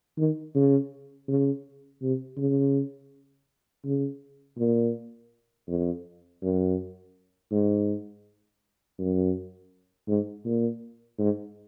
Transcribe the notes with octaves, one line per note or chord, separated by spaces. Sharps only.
D#3
C#3
C#3
C3
C#3
C#3
A#2
F2
F#2
G#2
F#2
G#2
A#2
G#2